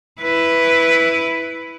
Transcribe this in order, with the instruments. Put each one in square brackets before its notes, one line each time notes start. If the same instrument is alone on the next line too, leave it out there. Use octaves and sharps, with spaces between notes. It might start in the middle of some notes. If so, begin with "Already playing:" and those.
[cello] E4 B4